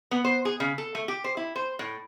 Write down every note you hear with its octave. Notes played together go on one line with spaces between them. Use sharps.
B3
C5
G#4
C#3
A4
A3
G4
C5
E4
C5
A2